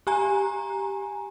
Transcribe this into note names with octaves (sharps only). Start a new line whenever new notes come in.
G4 G#5 A#5